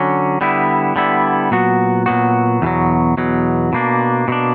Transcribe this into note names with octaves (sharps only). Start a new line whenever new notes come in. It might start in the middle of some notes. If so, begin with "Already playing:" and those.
Already playing: D3 F#3 C#4
D3 G3 B3 E4
D3 G3 B3 E4
A#2 F#3 B3 F#4
A#2 F#3 B3 F#4
E2 B2 F#3
E2 B2 F#3
B2 A#3 D4
B2 A#3 D4